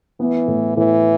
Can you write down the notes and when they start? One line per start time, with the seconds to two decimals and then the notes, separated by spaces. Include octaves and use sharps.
0.20 E3 B3
0.48 A2
0.77 A2 E3